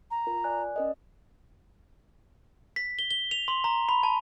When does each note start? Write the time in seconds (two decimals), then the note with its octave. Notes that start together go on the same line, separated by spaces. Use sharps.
0.11 A#5
0.27 F4 A#4
0.44 D5 G#5 F#6
0.59 D5
0.76 C#4 A#4 D#5
2.76 B6
2.99 G7
3.11 G7
3.31 F7
3.48 C6
3.64 A#5
3.89 B5
4.03 A5